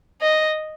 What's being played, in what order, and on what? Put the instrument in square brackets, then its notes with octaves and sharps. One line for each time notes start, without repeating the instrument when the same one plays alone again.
[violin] D#5